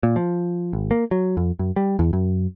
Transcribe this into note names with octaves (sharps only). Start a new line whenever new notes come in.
A#2
F3
G#1
A#3
F#3
F2
F#2
G3
E2
F#2